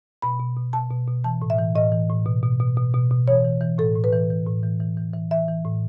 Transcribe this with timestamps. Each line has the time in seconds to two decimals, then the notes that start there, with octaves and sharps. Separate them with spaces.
0.22 B2 B5
0.40 B2
0.57 B2
0.73 B2 A5
0.91 B2
1.08 B2
1.24 E3 A5
1.42 A2
1.50 E5
1.58 E3
1.75 A2 D#5
1.92 E3
2.10 A2
2.26 B2
2.43 B2
2.60 B2
2.77 B2
2.94 B2
3.11 B2
3.28 E3 C#5
3.45 E3
3.61 E3
3.78 A2 A4
3.96 A2
4.04 B4
4.13 E3
4.30 E3
4.47 A2
4.63 E3
4.80 E3
4.97 E3
5.14 E3
5.31 E3 E5
5.48 E3
5.65 A2